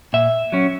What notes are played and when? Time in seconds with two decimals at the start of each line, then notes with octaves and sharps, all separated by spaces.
0.13 A#2 E5
0.52 F#3 C#4